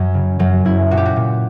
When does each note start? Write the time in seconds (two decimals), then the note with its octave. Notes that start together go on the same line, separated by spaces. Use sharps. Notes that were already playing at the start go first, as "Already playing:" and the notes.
Already playing: F#2 F#3
0.14 C#3
0.39 F#2 F#3
0.65 F#2 E4
0.90 A#2 F#4
0.97 G4
1.05 F#4
1.16 A#2